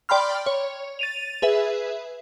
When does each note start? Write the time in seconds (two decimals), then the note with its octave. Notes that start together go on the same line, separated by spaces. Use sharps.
0.09 D5 G5 B5 C6 F6
0.46 C#5
0.99 A6 D#7 F7
1.42 G#4 B4 E5